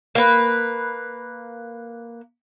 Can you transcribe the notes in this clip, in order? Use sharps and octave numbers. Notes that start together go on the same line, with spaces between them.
A#3 B4